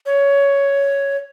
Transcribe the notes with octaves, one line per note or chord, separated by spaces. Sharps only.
C#5